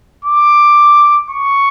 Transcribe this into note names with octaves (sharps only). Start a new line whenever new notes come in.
D6
C#6